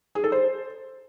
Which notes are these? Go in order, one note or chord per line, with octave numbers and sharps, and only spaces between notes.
G#4
A4
C5